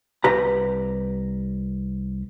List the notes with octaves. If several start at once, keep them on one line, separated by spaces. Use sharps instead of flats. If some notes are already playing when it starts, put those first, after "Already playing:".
C2 G4 B4 A#5